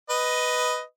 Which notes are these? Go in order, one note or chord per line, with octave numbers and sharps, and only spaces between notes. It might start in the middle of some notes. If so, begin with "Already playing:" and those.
B4 D#5